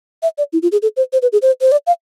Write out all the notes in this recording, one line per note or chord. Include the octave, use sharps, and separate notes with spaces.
E5
D5
E4
F4
G#4
A4
C5
C5
B4
G#4
C5
C5
D5
F5